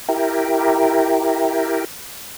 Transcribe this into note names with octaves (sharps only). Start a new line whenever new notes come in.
E4 G4 A#4